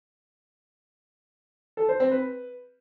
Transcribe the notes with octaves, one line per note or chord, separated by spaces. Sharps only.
A4
C5
C4
B4